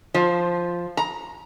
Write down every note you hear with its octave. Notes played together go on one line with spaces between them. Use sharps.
F3
A#5